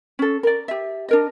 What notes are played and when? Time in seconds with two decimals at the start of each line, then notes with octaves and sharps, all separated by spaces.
0.19 C#4 A4
0.43 A#4 D5
0.68 G4 E5
1.09 D4 A#4 D#5